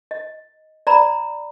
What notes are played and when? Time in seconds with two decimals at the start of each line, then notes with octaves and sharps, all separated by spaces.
0.11 D#5
0.87 D5 A#5 B5